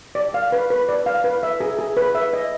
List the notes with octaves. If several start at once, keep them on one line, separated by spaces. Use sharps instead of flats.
D5
F5
B4
B4
D5
F5
B4
E5
G#4
G#4
B4
E5
D#5